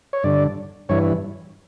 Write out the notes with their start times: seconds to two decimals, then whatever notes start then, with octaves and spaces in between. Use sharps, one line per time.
0.13 C#5
0.23 G2 D3 D5
0.89 G2 E3 C#5